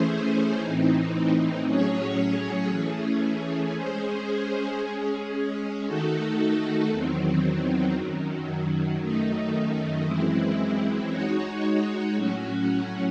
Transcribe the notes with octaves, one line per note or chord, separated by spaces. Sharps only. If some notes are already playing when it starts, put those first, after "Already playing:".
Already playing: E3 A3 C#4 G#4 C5
A2 E3 C4 D#4
A2 F#3 C#4 G#4 C#5
E3 A3 C#4 G#4
G#3 C#4 G#4 C5
G#3 C#4 G#4
D#3 A3 D#4 F#4 A4
E2 D#3 F#3 C4
F#2 D#3 F#3
F#2 D#3 A3 D#4
F#2 E3 G#3 C4 E4
G#3 D#4 F#4 C#5
A2 F#3 C#4 F#4